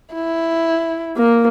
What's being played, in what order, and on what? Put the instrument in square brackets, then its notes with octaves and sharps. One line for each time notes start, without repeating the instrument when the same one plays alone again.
[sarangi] E4
[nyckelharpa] A#3